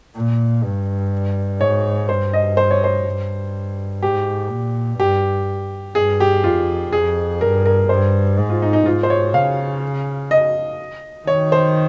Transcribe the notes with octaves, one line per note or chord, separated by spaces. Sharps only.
A#2
G2
G#2 C#5
G2 C5
D#5
C5
C#5
C5
G2
G#2 G4
A#2
G2 G4
G2 G#4
G4
F2 F4
F2 G#4
G2 A#4
A#4
G2 C5
G#2
F4
D#4
D#4
G#2 F4
C5
C#5
C#3 F5
D#5
D#3 C#5
C5